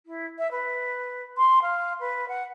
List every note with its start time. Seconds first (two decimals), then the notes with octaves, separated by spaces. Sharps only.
0.06 E4
0.38 E5
0.51 B4
1.37 C6
1.62 F5
2.00 B4
2.28 F#5